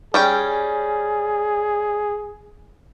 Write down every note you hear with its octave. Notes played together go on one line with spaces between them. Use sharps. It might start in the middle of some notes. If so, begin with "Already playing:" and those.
G3 C#4 G#4 G5